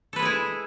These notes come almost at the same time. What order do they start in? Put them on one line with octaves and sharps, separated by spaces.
A4 B4 G#3 G#4 E4